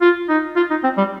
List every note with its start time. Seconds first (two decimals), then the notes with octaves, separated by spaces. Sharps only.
0.01 F4
0.29 D#4
0.56 F4
0.70 D#4
0.84 C4
0.98 G3